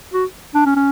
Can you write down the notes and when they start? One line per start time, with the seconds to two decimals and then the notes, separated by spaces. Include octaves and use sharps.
0.13 F#4
0.54 D4
0.66 C#4
0.76 C#4